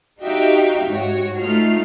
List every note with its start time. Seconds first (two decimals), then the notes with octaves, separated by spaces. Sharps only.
0.22 D#4 F#4 G4 E5 F5 G5
0.88 G#2 F#4 C#5
1.39 A3 D#4 F4 F6 C7